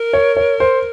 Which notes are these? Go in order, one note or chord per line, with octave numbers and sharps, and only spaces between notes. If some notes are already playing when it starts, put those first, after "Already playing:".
Already playing: A#4
C#5
C#5
C5